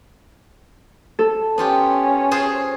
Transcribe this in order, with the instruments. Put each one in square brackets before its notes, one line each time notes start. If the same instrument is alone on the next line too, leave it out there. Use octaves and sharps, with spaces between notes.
[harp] A4
[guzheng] B3 F4 G4 [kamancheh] C#4
[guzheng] F4 G#4 C5